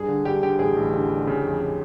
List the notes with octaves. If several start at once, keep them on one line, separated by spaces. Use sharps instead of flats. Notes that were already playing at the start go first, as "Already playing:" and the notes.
Already playing: G2 G#4
D3
G2 G4
D3 G4
A1 G#4
A1
D3
D3
C#3
F2
C#3